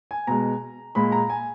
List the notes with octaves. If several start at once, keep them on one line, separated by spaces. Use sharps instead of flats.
G#5
B2 G#3 A#5
A#2 G#3 B5
A#5
G#5